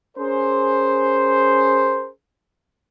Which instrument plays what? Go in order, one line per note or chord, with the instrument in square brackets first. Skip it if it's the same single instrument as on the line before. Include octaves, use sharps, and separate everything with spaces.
[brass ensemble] C#4 G#4 A#4 C5